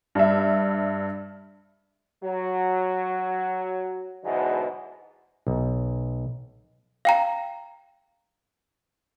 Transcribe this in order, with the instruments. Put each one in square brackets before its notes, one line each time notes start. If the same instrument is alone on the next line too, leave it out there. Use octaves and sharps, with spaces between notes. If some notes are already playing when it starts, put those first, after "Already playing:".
[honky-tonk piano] G2 E5
[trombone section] F#3
G#2 B2 D3 E3 F#3 G#3
[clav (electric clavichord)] B1
[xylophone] F5 G5 A#5